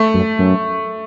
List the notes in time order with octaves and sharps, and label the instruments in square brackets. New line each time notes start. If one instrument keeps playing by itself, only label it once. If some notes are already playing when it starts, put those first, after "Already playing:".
Already playing: [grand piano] A3
[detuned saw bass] F#2
F#2